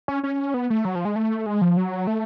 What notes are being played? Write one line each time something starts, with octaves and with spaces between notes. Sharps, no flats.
C#4
C#4
B3
A3
F#3
F3
G#3
A3
G#3
F3
F#3
A3